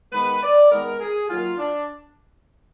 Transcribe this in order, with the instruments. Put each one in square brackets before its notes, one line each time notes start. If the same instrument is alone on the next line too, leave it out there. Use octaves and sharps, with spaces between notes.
[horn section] D#3 G#3 B3 B4
D5
D#3 G#3 B3 A#4
G#4
D#3 F#3 A#3 F4
D4